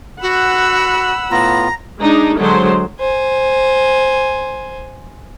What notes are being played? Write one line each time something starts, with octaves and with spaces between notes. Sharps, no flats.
F#4 F#5 B5 E6
A2 B3 F4 A#5
G#3 D4 D#4
D3 F#3 G#3 A4 C5
C5 G#5